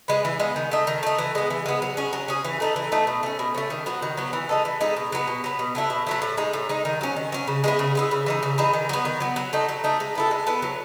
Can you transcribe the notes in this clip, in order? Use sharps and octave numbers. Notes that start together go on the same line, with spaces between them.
G#3 B3
E3
G#3 B3
D#3
A3 D#4
D#3
A3 D#4
E3
G#3 B3
E3
G#3 B3
F#3
C#4 G#4
F#3
C#4 G#4
E3
A3 D#4 A4
E3
A3 D#4 A4
B2
A3 C#4
B2
A3 C#4
D#3
F#3 B3 F#4
D#3
F#3 B3 F#4
E3
G#3 D#4 A4
E3
G#3 D#4 A4
B2
F#3 B3
B2
F#3 B3
B2
F#3 A3 E4
B2
F#3 A3 E4
A2
G#3 D#4
A2
G#3 D#4
D#3
F#3 C#4
D#3
F#3 C#4
C#3
G#3 B3 E4
C#3
G#3 B3 E4
C#3
E3 G#3 D#4
C#3
E3 G#3 D#4
D#3
F#3 B3
D#3
F#3 B3
F#3
A3 D#4
F#3
A3 D#4
G#3
B3 E4 A4
G#3
B3 E4 A4
F#3